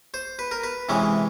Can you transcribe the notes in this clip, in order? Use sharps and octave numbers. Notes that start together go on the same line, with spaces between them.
C5
B4
A#4
B4
C3 E3 G#3 C#4